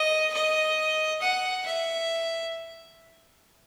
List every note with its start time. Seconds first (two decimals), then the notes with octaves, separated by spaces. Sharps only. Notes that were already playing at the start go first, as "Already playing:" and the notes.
Already playing: D#5
0.34 D#5
1.22 F#5
1.66 E5